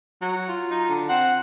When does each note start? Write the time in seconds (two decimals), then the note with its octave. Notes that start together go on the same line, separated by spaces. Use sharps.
0.21 F#3
0.49 F4
0.71 D#4
0.88 D3
1.09 C4 F#5